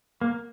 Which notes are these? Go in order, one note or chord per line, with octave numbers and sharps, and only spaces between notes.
A#3